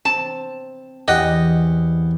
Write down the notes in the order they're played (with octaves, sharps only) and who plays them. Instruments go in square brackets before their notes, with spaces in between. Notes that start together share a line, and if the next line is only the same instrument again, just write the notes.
[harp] C4 [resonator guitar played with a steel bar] A5
[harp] E2 [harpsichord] G4 F#5 [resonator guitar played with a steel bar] D#5